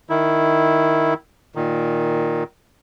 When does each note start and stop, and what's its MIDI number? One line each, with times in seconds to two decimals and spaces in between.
0.10 1.14 51
0.10 1.14 64
1.55 2.43 46
1.55 2.43 51